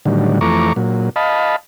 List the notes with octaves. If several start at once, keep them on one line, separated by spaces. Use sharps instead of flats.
A2 D3 D#3 F#3 G3
F2 E3 A3 A#5 C#6 D6
A#2 F#3
D#5 F5 A5 B5